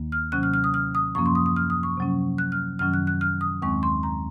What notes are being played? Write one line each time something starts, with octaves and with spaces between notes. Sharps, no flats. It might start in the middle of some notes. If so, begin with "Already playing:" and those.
Already playing: D#2 D#3 A#3
F6
C3 F#3 C#4 F#6
F6
F6
D#6
F6
D#6
F#2 F3 A#3 C#4 C#6
C6
D#6
D#6
F6
D#6
C#6
C3 F#3 C#4
F#6
F6
F#2 D#3 F#3 C#4 F6
F#6
F#6
F6
D#6
D#2 D#3 G#3 C4 C#6
C6
A#5